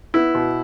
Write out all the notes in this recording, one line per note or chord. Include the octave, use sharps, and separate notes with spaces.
B3 E4
B2